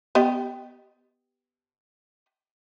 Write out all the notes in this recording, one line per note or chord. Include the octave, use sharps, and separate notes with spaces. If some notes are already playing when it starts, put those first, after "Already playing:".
B3 G4 D#5